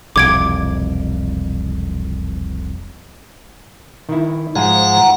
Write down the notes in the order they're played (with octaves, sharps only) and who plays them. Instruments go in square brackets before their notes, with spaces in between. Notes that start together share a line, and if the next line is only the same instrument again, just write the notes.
[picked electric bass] E1 C2 F2 [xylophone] D6 G#6 D7
[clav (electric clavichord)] D#3 E4
[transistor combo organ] G#2 [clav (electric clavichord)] F3 F5 G#5 [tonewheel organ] F#5 A#5